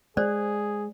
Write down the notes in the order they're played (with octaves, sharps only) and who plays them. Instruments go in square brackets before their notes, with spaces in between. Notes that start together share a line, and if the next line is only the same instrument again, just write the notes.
[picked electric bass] G#3 [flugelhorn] G#4 [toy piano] C5 D5